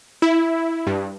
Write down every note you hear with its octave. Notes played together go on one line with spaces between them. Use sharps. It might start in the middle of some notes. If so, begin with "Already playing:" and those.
E4
G2